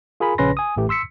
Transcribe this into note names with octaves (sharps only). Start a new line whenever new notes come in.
F4 G#4 A#4 G#5 B5
A#1 C#3 C#4 B4 C6 A#6
G#5 D#6
A1 A2 E3 A3 G4
C6 E6 B6 C#7